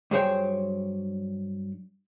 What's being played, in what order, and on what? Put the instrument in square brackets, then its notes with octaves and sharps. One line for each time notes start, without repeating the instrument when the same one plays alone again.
[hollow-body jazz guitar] G2 F#3 G#4 C5 C#5 G5